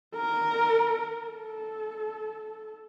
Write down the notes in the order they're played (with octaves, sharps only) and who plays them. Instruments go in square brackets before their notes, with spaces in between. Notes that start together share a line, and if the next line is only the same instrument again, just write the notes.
[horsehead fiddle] A#4
A4